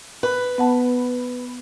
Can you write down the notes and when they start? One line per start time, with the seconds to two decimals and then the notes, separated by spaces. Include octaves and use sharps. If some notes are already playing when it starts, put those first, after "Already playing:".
0.23 B4
0.58 B3 F#5 A5